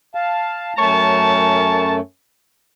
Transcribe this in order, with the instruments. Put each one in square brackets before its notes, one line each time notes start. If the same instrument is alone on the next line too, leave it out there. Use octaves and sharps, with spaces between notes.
[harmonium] F5 A5
[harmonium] F#2 A3 [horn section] A#4 C#5 A5